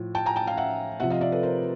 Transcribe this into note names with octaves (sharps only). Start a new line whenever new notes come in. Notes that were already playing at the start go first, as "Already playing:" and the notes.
Already playing: A2 F3
G5 A5
G#5 A#5
G5 A5
F5 G5
E5 F#5
C3 F3 E5 F#5
D#5 F5
D5 E5
A4 B4
A#4 C5